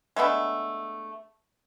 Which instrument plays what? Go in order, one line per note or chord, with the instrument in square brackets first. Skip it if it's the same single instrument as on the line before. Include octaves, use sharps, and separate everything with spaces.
[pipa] G#3 A3 B3 D4